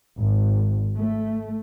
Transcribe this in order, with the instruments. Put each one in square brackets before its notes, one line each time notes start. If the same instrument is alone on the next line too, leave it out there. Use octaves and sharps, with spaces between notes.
[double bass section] G#1
A3